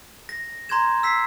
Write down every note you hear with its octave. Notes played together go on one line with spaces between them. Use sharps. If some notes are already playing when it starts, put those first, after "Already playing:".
A#6
A#5 C6 G6 G#6 E7
E6 B6 C7